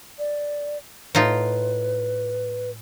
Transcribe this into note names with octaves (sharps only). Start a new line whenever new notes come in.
D5
A2 D#4 F4 B4